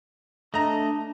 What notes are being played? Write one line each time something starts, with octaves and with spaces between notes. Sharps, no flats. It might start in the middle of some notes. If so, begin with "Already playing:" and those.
A3 D4 D#5 A#5